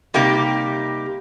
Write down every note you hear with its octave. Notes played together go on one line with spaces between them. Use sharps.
C3 G3 A#3 D#4 G4